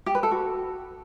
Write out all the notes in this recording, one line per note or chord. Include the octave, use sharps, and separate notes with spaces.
G4
B4
A4
F#4